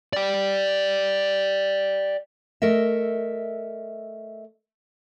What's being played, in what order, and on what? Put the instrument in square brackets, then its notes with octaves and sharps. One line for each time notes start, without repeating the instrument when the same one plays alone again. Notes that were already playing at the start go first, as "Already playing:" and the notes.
[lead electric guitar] D5 G5
[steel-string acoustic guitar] A3 A#4 D#5 E5